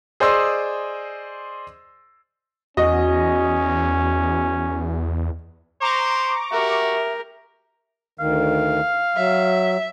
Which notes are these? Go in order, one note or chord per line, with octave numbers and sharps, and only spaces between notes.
G#4 C5 D5 D#5 C6 E6
E2 C#4 F#4 D#5
C5 A#5 C#6 D6
F#4 G4 A#4 E5
D2 D#3 F5
F#3 E5